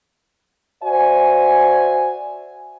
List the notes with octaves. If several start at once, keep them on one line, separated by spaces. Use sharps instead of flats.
F#4 C5 D5 E5 G#5